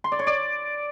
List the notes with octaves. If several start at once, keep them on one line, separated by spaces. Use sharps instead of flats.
C6
D5
C#5
D5